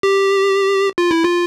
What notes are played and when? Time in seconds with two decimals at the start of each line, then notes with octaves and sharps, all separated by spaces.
0.03 G4
0.98 F4
1.11 E4
1.24 F4